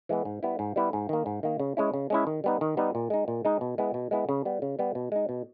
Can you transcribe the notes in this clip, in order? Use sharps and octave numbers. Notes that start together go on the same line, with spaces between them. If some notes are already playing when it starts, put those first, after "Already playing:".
E3 G#3 B3
G#2
G3 B3 E4
G#2
G3 B3 E4
G#2
D#3 A#3
G#2
D#3 A#3
C#3
G#3 C#4 E4
C#3
G#3 C#4 E4
D#3
G3 B3 D#4
D#3
G3 B3 D#4
A#2
G#3 D#4
A#2
G#3 D#4
B2
G#3 B3 E4
B2
G#3 B3 E4
C#3
G3 B3
C#3
G3 B3
B2
G#3 D#4
B2